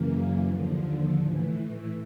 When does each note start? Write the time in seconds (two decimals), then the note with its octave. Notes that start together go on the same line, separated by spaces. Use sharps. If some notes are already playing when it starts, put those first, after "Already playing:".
Already playing: F#2 C#3 E3 A#3
0.47 D#2 D3 F3
1.19 A2 E3